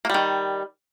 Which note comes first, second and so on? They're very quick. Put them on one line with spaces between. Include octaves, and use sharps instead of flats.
A#3 G3 D#3